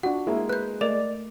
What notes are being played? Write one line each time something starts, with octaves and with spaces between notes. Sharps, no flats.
D4 F4 F#4 F#5
G#3 A#3 E4
B4 F#6 G6
A3 A#4 D5 D#5 E7